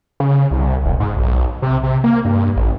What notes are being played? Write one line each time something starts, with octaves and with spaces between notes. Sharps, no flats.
C#3
C2
E1
G#2
B1
C3
C3
A#3
G2
A1